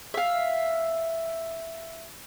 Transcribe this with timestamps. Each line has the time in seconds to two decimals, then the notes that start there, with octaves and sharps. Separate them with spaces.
0.14 E5 F5